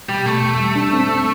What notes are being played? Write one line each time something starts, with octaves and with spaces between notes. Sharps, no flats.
B2 G3
B2 A3
E2
G3
D4
C4
C4